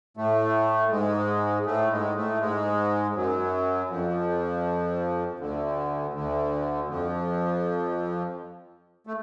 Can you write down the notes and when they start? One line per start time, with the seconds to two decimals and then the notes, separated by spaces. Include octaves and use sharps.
0.17 A2 A3
0.91 G#2 G#3
1.66 A2 A3
1.91 G#2 G#3
2.16 A2 A3
2.40 G#2 G#3
3.15 F#2 F#3
3.90 F2 F3
5.39 D2 D3
6.14 D2 D3
6.88 F2 F3
9.07 A3